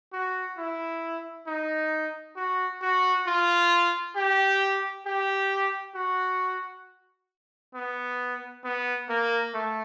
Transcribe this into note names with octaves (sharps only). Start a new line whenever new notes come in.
F#4
E4
D#4
F#4
F#4
F4
G4
G4
F#4
B3
B3
A#3
A3